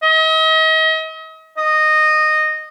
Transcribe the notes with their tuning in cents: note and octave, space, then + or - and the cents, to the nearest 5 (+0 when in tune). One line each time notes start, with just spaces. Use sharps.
D#5 +40
D#5 -15